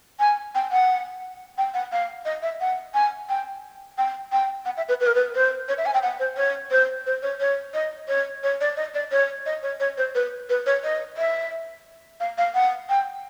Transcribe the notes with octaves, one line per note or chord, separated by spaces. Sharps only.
G#5
G5
F#5
G5
F#5
F5
D#5
E5
F#5
G#5
G5
G5
G5
F#5
E5
B4
B4
A#4
B4
C5
C#5
E5
G#5
G5
F#5
C5
C#5
C5
C5
C#5
C#5
D#5
C#5
C#5
D5
D#5
D5
C#5
D#5
C#5
C#5
C5
B4
B4
C#5
D#5
E5
F5
F5
F#5
G5